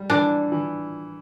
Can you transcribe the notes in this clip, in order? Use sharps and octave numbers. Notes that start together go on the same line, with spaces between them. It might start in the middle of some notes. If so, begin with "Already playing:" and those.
Already playing: G3
E3 D4
E3